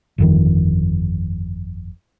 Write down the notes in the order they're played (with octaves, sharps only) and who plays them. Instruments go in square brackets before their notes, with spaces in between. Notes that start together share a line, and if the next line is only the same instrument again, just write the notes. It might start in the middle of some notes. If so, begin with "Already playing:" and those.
[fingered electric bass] G1 F2 D#3